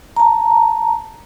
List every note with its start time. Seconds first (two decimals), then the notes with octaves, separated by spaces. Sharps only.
0.17 A5 A#5